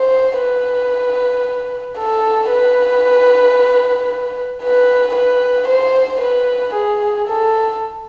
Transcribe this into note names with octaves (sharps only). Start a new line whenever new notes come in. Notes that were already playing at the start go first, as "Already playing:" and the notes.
Already playing: C5
B4
A4
B4
B4
B4
C5
B4
G#4
A4